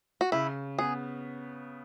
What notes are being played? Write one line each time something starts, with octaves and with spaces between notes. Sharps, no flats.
F#4
C#3 E4
B3 G#4